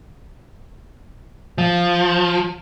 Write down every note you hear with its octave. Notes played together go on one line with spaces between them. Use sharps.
F3